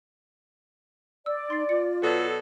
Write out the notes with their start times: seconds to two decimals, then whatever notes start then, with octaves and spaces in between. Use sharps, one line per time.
1.26 D5 E6
1.50 D#4 C6 A6 C7
1.69 F4 C#7
2.02 B2 F#3 A4 B4 D5 A5